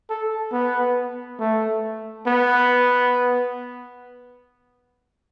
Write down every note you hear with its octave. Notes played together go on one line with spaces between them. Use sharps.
A4
B3
A3
B3